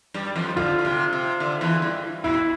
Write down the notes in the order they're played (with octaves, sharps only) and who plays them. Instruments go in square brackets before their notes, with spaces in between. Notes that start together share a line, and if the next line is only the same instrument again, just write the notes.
[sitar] G2 G3
F2 F3
[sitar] D3 [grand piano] F4
[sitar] D3
C3
C3
D3
E2 E3
G2
[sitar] B2 [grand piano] E4